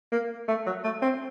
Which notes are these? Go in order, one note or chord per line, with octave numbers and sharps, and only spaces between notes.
A#3
A3
F#3
A3
C4